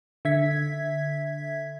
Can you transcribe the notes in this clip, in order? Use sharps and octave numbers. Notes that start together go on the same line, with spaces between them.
D3 E5 G#6 B6